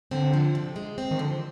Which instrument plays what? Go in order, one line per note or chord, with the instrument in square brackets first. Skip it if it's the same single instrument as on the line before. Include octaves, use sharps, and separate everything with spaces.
[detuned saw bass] D3 [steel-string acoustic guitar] C4
[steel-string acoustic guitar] F3
C3
G#3
C4
[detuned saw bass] D#3
[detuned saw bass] D3 [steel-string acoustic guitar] F3